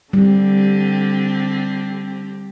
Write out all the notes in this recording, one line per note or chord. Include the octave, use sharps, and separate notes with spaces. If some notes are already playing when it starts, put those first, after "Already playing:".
D3 G3 C4 G4